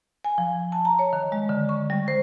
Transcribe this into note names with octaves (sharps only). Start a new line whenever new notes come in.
G#5
F3
A5
A#5
C#5
D#3
G#3
D3
C#6
G3
C5